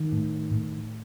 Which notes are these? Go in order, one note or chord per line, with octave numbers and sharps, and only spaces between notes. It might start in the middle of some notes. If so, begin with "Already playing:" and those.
Already playing: D#3
A2
A2